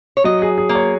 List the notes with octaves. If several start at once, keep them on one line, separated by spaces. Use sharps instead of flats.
C#5
F#3 D#5
G#4
G#4
A#3
C#5